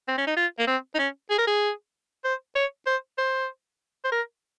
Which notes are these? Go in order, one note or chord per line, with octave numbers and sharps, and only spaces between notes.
C4
C#4
D#4
F4
A#3
C4
D#4
C#4
G#4
A#4
G#4
C5
C#5
C5
C5
C5
A#4